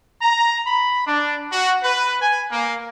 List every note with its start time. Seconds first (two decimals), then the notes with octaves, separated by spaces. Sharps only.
0.22 A#5
0.67 B5
1.07 D4
1.52 F#4
1.84 B4
2.22 G#5
2.52 A#3